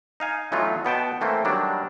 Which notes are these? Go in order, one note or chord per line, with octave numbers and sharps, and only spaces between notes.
D#4 F5 G#5
E3 F#3 A3 B3 D#4 F4
B2 B3 G5 A5
E3 A3 A#3 C4
D#3 F#3 G3 A#3 D4